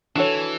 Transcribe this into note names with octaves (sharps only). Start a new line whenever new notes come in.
E3 D4 F#4 A4 C#5